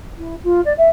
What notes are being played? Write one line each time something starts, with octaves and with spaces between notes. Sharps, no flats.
E4
F4
D5
E5